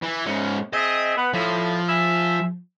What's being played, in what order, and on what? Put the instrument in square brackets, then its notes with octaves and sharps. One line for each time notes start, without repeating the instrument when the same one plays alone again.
[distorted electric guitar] E3
G#2 C#4
[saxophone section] C4 G#4 E5 [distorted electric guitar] D#5
[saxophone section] B3
[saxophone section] A2 [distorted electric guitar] F3
[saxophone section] G#4 E5